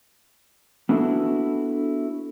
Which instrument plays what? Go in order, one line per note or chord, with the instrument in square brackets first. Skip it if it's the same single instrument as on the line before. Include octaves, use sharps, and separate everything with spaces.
[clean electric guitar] B3 D4 E4 F#4 A4